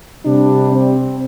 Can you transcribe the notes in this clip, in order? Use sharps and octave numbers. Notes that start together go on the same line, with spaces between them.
C3 G3 D4
C4